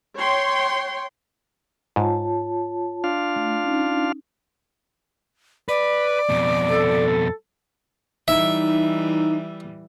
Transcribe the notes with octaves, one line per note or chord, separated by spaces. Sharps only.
C#5 G5 C6
G#2 F4 C#5 A5
D4 F4 F5
A3
C#4 D#4
B4 D5
F2 B2
A4
E3 G3 D#4 E5